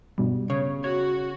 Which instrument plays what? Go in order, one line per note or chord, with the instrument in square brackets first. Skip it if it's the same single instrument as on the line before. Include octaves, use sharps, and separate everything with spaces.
[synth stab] G2 B2 G3
[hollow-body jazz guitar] C#3 [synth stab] C#5
[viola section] F#4 [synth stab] C#5